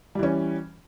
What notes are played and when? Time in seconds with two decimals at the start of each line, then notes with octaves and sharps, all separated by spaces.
0.15 G3
0.19 E3
0.23 C#4